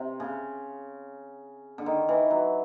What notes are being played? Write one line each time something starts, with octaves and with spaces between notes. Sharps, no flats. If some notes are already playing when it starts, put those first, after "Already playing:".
Already playing: C3
C#3
D3
D#3
E3
F#3